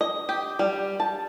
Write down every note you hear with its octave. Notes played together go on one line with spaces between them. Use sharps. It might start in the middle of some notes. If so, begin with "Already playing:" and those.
D#5
G4
G3
A5